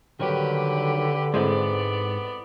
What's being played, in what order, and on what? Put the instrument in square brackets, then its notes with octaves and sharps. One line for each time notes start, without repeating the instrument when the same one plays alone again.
[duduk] D3 [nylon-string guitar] D#3 F#3 G3 [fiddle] G4 B4
[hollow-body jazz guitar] G#2 G#3 [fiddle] B3 D5 [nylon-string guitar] C4 E4 A4